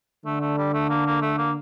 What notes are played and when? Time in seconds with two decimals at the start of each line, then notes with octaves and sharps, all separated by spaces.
0.25 D3 A3
0.41 A3
0.58 G3
0.74 A3
0.90 A#3
1.06 A#3
1.22 A3
1.38 A#3